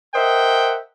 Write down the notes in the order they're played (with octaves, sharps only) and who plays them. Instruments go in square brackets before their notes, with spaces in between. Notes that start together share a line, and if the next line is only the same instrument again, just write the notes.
[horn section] A#4 C5 D#5 E5 F#5 G5